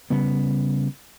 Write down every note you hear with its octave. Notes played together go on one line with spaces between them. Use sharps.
C#3 G3 B3